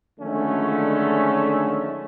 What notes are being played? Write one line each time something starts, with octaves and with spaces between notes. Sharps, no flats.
D3 D#3 F3 G#3 A3 C#4